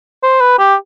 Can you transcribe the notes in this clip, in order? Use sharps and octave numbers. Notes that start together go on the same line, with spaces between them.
C5
B4
G4